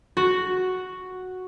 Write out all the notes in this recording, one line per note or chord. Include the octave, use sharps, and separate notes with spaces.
F#4